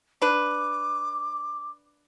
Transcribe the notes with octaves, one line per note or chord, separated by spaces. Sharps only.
D4 B4 D6